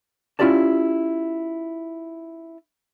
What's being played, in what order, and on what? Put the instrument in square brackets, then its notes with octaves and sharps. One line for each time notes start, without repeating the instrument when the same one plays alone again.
[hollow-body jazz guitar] C#4 E4 F4 G4 D5 A5